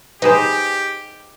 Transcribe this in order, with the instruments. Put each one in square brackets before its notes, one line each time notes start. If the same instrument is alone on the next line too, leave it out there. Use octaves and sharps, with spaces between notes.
[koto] D#4 G#4 C5 [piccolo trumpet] G4 [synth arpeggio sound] B4 D#5 B5